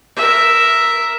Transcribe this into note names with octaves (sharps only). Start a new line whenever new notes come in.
A#4 E5